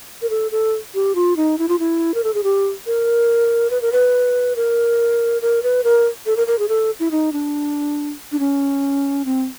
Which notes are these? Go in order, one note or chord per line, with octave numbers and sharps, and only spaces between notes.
A#4
A4
A4
G4
F4
D#4
E4
F4
E4
A#4
A4
G#4
G4
A#4
B4
A#4
B4
A#4
A#4
B4
A#4
A4
A#4
A#4
G#4
A4
E4
D#4
D4
D4
C#4
C4